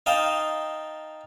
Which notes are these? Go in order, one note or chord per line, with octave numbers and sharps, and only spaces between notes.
D#4 D#5 F5 G5 A5